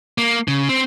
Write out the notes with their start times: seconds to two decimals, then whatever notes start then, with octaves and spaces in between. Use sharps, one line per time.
0.18 A#3
0.48 C#3
0.69 C4